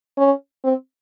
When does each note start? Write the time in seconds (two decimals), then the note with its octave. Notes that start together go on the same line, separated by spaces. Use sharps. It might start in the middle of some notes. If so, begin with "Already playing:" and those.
0.18 C#4
0.64 C4